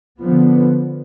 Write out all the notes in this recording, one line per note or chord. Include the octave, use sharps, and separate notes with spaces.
D3 F3 B3